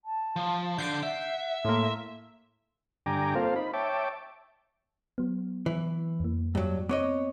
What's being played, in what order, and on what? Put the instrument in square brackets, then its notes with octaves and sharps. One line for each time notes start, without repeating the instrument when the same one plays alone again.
[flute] A5
[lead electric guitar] F3
[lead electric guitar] D3 [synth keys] G6 C7 D7
[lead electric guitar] E5 [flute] F#5
[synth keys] A2 A#3 [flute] C6
[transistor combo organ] G2 D3 G5 G#5 A#5 D6
A#3 C4 F4 A4 C5 F5
D#4 B5
C#5 E5 G5 A5 D6
[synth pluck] F#3 B3
[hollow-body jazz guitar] E3
[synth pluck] F2 A#3
[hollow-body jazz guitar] G2 F#3
[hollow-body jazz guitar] B3 C#5 D#5 [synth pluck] C4 C#6 D6